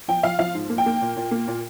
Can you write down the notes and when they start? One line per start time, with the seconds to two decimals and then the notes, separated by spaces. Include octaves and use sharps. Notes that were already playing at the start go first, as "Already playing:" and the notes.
0.08 F3 G5
0.23 F3 F5
0.39 F3 F5
0.55 G#2
0.70 A#3
0.78 G5
0.86 A#3
1.01 A#2
1.16 A#2
1.31 A#3
1.48 A#2